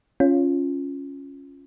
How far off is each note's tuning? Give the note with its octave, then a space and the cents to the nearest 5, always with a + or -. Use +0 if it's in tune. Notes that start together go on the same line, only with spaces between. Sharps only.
C#4 +0 F4 +0